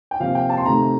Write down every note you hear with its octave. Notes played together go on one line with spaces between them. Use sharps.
G5
C3 F3 A#3 F5
G5
A5
C6
C3 D#3 A3 A#5